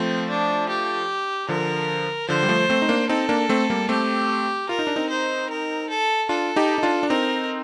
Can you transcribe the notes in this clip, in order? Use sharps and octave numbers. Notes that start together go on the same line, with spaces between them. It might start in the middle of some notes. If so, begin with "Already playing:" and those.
Already playing: F3 A3 C4
D4
G4
D3 F3 A#4
D3 F3 C5
G3
F3 A3
A3 C4
D#4
A#3 D4
C4 D#4 A4
A#3 D4
A3 C4
G3 A#3
A3 C4 G4
F4 A#4
D#4
D4
C4 D#4
C5
A#4
A4
D4 F4 A4
D#4 G4
D#4
D4 F4
D4
C4 D#4 A#4